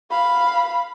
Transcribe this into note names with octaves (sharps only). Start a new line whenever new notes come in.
F5 B5